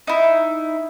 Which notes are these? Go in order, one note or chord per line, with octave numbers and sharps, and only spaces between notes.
D#4 E4